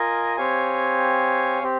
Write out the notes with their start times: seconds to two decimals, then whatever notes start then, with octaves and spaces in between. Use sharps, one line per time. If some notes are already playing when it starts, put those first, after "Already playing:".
Already playing: F4 A#4 D#5 G#5
0.37 C4 G4 C#5 F5 G#5
1.62 C4 G4